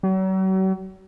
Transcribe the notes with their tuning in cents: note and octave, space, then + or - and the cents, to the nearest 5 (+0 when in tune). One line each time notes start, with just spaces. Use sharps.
F#3 +40